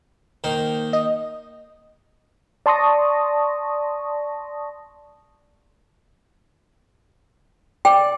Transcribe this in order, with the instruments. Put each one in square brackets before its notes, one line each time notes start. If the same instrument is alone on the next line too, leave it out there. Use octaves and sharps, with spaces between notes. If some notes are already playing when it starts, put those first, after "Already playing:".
[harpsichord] D#3 A#3 C5
[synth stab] D#5
[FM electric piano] D5 A5 C6 C#6 D#6 A#6
[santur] D5 [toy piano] G5